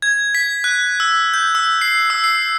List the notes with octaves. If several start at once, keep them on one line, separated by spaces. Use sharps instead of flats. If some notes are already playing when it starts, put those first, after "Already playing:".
G#6
B6
F#6
E6
G6
E6
C7
E6
C7